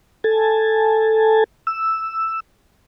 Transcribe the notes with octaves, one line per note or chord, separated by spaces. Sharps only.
A4 G#5 A5
E6